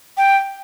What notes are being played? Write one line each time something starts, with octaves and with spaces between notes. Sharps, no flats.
G5